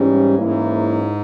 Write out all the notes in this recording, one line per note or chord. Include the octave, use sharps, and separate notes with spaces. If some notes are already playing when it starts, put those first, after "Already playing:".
Already playing: G#2 E3 G3 C#4
G#2 E3 A#3 C#4 E4